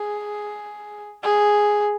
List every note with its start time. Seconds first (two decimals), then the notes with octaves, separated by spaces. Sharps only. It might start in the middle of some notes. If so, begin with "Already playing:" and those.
Already playing: G#4
1.23 G#4